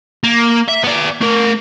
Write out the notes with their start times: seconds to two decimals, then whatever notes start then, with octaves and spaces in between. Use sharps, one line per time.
0.24 A#3
0.68 E5
0.83 B3 D5
1.21 A3 A#4